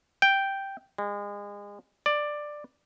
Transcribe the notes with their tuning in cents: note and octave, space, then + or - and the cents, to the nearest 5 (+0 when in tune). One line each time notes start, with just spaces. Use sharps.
G5 +0
G#3 -30
D5 +10